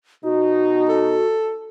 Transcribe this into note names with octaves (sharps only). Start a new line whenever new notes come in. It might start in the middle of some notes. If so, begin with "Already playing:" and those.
B2 D#4 F#4
A4